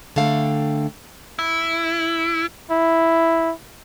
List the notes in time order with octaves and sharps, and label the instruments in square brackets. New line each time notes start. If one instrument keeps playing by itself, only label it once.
[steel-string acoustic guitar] D3 A3 F5 G5
[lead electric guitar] E4
[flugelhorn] E4